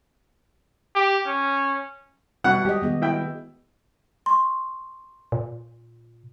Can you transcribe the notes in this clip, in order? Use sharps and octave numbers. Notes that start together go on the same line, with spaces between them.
G4
C#4
B2 G3 F#4 F#5
G#3 G4 D#5
D#3 B3 G#4
E4 G5
C6 C#6
A#2